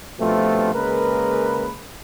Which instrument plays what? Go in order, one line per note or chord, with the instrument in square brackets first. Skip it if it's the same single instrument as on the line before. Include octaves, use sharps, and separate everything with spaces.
[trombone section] G2 B2 F3 A3 C4 F4
C#3 G#3 A#3 A#4 B4